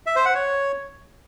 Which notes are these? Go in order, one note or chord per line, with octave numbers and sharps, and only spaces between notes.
E5
C5
F#5
C#5